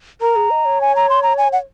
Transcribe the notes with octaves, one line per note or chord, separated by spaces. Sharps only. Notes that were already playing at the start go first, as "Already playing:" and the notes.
A#4 A#5
G#4
D#5
C#5
G#5
A#5
C6
A#5
G#5
F#5